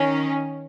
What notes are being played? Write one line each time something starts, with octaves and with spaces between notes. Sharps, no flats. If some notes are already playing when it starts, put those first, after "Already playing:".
Already playing: D#3 C#4